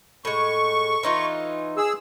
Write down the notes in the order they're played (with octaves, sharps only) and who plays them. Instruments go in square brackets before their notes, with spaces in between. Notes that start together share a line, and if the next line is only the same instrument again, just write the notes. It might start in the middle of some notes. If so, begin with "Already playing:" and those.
[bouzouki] A2 G#3 [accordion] C#6
[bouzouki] E3 D#4 F4
[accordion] G#4 E6